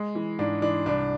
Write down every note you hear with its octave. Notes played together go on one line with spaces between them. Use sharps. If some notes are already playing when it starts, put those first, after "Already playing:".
Already playing: G#3
E3
G#2 D4
E3 D4
C2 D4